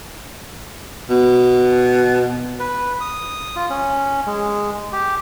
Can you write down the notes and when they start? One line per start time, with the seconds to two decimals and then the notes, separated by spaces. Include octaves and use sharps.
1.09 B2
2.59 B4
3.01 D#6
3.56 F4
3.70 C#4
4.27 G#3
4.92 G4